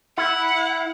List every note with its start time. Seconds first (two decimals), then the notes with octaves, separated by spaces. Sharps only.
0.18 E4 F#5